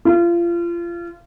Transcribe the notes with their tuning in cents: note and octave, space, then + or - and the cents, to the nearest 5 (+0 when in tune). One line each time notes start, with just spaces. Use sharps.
F4 -30